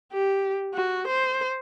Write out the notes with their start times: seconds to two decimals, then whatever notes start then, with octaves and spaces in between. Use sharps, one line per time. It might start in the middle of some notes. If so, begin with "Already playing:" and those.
0.13 G4
0.74 F#4
1.07 C5